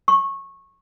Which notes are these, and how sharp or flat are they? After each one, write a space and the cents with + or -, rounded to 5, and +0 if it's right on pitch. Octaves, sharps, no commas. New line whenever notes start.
C#6 -20